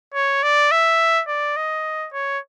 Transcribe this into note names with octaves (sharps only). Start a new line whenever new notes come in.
C#5
D5
E5
D5
D#5
C#5